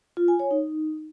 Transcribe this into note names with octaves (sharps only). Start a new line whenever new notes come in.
F4
G#5
C#5
D#4